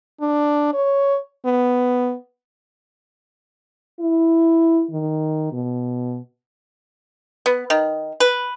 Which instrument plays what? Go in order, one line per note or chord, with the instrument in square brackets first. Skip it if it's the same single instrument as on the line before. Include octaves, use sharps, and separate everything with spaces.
[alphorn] D4
C#5
B3
[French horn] E4
D#3
B2
[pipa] B3
D#3
B4